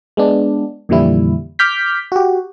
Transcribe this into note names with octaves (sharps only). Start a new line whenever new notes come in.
G#3 B3 D4
F2 A#2 D3 E3 G3 E4
D6 F6 G6 B6
F#4 G4